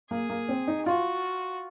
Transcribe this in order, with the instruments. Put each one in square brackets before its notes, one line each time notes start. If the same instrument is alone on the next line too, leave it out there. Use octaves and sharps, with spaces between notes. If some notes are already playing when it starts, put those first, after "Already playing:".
[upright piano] A#3 [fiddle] G#4
[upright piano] A#3
C4
D#4
[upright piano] F4 [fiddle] F#4